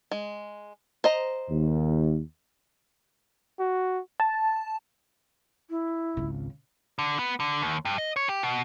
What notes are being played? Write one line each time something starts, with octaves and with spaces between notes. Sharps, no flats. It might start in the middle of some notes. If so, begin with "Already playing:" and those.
G#3
C5 D#5 A#5
D#2
F#4
A5
E4
G#1 C#2 C#3
D3
B3
D3
D#2
G2
D#5
C#5
G4
B2